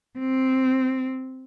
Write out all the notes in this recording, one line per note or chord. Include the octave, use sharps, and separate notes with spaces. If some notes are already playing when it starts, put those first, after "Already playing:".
C4